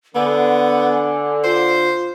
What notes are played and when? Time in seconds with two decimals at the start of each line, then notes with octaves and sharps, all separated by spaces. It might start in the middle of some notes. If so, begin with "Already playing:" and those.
0.15 D3 B3 G#5
1.44 F4 C5